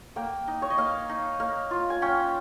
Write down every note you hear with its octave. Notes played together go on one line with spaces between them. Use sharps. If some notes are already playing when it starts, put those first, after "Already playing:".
A#3 G5
D#4
C#5
D#5
A#3 F5
D#4
A#3 F5
F4
G#5
C#4 G5